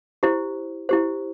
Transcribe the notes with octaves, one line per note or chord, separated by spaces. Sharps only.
E4 G4 C5
E4 G4 C5